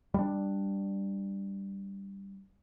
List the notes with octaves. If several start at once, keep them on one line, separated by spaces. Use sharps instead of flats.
G3 D4